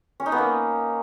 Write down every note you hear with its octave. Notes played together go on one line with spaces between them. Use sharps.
C#4
D#4
B3
A#3